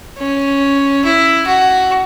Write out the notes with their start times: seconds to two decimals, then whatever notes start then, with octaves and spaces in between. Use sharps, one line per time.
0.18 C#4
1.04 E4
1.47 F#4